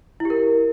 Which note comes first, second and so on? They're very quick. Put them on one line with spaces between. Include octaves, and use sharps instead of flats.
E4 G4 A#4